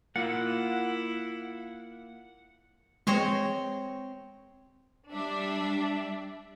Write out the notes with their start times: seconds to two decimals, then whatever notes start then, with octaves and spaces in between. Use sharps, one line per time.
0.16 A#3 E4 F4 F#5 C#7
3.07 G#3 C4 C#5 C6 A#6
5.12 G3 D4 E5